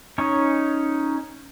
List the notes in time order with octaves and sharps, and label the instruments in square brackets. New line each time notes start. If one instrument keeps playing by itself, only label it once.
[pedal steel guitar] C#4 D#4 C#5